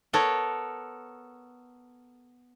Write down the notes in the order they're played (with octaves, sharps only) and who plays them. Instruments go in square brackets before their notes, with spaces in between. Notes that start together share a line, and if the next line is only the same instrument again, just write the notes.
[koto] B3 A4 A#4 C#5